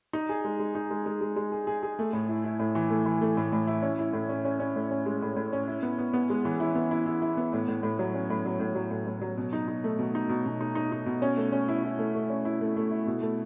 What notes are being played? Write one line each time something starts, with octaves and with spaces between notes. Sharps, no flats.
D#4
G#4
G#3
G#3
D#4
G#3
G#3
G#3
G#3
G#4
G#4
G#4
A3
A2
E4
E4
A2
E3
A3
E3
A3
A2
A2
E4
C#4
E4
A2
C#4
C#4
C#4
A2
C#4
G#3
A2
A2
C#4
E4
B3
B3
B3
G#3
E3
E4
B3
E4
E4
E4
B3
A2
A2
A2
F#3
C#4
A2
F#3
A2
F#3
A2
A2
F#3
B2
D#4
D#4
A3
B2
D#4
B2
B2
D#4
D#4
D#4
B2
C#4
A3
C#4
E4
E4
A3
A3
C#4
E4
A3
A3
E4
B2
A3